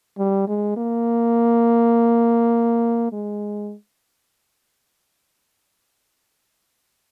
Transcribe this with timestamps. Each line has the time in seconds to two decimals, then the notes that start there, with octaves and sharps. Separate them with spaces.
0.18 G3
0.48 G#3
0.77 A#3
3.12 G#3